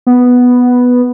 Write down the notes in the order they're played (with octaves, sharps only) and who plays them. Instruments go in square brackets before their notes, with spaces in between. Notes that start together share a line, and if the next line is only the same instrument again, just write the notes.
[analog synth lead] B3